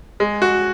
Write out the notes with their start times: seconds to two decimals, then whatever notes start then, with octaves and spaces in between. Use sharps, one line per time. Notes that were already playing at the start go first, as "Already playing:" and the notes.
0.20 G#3
0.42 F#4